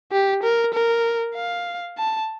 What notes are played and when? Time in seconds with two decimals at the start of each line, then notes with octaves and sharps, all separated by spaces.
0.12 G4
0.43 A#4
0.74 A#4
1.35 F5
1.98 A5